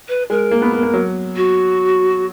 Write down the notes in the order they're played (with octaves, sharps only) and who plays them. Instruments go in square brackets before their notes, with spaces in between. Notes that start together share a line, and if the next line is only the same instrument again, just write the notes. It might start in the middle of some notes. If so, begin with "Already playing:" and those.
[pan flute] B4
[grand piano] G#3 [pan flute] A#4
[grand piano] A#3
B3
B3
A#3
F#3
[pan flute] F#4